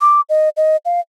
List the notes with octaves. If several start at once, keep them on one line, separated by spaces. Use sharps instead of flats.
D6
D#5
D#5
F5